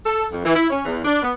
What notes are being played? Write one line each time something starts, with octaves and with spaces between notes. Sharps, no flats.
A4
F2
E3
E4
C#4
E2
D4
B3